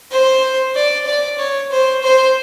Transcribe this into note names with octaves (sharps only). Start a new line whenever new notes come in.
C5
D5
D5
C#5
C5
C5